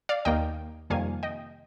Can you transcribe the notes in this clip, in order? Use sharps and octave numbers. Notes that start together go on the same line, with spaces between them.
D5 F5
D#2 D#3 A#3 D#5 G5
F2 C3 D#3 G3 A#3 F5 G#5
D#5 G5